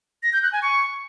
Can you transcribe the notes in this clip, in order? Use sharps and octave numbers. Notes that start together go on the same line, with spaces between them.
A#6
G6
F#6
G#5
C#6